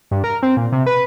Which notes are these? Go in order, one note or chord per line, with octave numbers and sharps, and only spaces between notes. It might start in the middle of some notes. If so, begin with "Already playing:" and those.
G2
A#4
C4
A#2
C3
B4